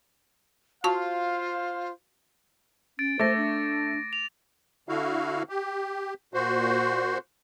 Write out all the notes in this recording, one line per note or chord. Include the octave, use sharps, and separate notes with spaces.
F4 F#4 C5 F5 A5 C#6
C#4 A6 D7
A3 C5 D6 A6 A#6
D4
F7
D3 E4 F#4 F5
G4
A#2 F#4 C5